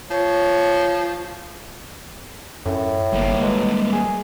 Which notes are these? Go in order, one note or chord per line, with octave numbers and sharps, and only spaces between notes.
F3 C#5
F#2 A2
G1 G3 A#3
B2 G#3
G#4